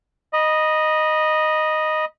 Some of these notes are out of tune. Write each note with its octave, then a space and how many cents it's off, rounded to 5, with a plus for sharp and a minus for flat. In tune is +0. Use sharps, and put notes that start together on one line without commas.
D#5 -5 B5 -35